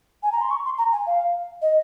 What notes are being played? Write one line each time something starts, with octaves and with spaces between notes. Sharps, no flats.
G#5
A#5
C6
C#6
C6
A#5
G#5
F5
D#5